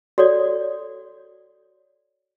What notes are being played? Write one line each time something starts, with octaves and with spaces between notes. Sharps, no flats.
F#4 A4 C#5 D5